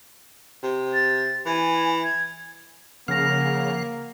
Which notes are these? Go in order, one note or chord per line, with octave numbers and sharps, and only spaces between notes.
C3
A6
E3 G#5
G#6
C#3 F3 A#3 F#5 F6 A#6